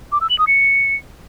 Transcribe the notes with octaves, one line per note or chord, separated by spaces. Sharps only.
D6
E6
F#7
D#6
C#7